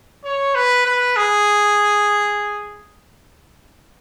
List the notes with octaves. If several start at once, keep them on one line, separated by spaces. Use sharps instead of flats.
C#5
B4
B4
G#4